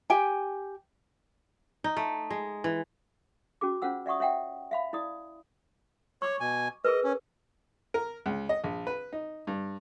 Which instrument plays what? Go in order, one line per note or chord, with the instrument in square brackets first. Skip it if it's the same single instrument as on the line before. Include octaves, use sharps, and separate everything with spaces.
[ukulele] G4 G5 G#5
[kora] D#4
A3
G#3
E3
[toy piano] C#4 F#4 G#4 D6
C#4 F4 C5 F#5 E6
D5 E5 F#5 C#6 D#6
C#5 E5 F#5 G5
E5 F5 B5
E4 D5 D#6
[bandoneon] C#5 [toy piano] C#6 D6
[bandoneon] B2 G#5
[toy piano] G#4 A#4 B4 [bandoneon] D#5
[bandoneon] C#4
[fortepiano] A#4
C#2
D#5
A#1
B4
D#4
G2